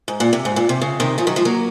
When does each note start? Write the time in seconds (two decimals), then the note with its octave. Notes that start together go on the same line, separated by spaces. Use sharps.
0.08 G#2
0.20 A#2
0.33 C3
0.45 G#2
0.56 A#2
0.69 C3
0.81 C#3
1.00 C3 D#3
1.18 C#3 F3
1.27 D#3 F#3
1.36 F3 G#3
1.45 F#3 A#3